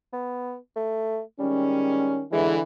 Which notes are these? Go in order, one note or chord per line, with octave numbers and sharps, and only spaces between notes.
B3
A3
D#3 G3 G#3 C#4
D3 E3 G#3